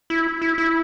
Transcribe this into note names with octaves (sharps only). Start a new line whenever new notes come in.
E4
E4
E4